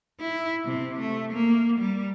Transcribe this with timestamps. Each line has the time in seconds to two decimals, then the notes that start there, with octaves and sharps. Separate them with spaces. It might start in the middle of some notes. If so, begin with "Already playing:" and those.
0.21 E4
0.66 C3
1.00 A3
1.33 A#3
1.79 G3